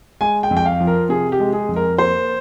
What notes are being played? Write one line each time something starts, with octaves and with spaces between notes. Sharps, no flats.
G#3 G#5
G5
F2
G5
F5
F3
A#4
C3 G#4
G4
G#3
G#4
F2
A#4
A#3 C5